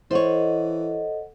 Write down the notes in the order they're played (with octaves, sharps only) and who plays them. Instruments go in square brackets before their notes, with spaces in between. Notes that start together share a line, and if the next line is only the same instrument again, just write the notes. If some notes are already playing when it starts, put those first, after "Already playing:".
[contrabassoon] E3 [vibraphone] A4 D#5 F#5 [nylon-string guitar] C5 C#5